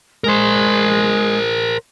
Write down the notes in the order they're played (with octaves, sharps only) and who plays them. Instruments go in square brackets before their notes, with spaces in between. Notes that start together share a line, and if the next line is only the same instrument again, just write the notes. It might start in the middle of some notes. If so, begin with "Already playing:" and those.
[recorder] G#3 [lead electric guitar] A#4 C5